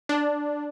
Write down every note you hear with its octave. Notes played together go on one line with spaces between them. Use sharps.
D4